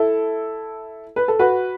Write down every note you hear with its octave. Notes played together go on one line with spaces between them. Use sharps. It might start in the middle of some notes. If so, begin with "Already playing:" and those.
Already playing: E4 A4
B4
A4
F#4 B4